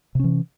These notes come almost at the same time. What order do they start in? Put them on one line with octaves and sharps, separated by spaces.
C3 C#4 E3